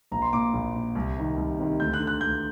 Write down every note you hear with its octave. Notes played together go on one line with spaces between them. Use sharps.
A#1 A#5
C6
A#2 D6
A#1
A#2
C2
C3 D#3
C2
C3 D#3
D2 G6
F#6
D3
F#6
D2 G6